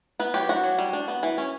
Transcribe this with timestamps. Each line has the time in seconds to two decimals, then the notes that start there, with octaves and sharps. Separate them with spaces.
0.20 B3 B4
0.34 F#3 G4
0.49 D4 F#4
0.64 F#3
0.78 G3
0.93 D4
1.08 B3
1.23 E3
1.38 C#4